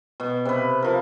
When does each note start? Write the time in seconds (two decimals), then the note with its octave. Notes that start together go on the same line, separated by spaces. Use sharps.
0.20 B2
0.45 C3 B4
0.82 F3 A#4